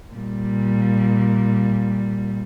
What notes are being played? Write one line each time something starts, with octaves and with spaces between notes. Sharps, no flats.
A#2 G3